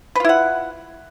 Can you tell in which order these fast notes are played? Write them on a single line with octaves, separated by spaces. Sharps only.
B4 F4 E4 F#5